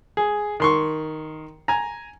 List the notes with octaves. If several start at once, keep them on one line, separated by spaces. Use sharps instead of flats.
G#4
D#3 C6 C#6
G#5 A#5